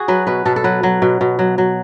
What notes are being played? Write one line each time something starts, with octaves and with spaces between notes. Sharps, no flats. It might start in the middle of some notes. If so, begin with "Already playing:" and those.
Already playing: F#4 G#4
F#3 B4
B2 B4
B2 A4
A4
F#3 B4
F#3
B2
B2
F#3
F#3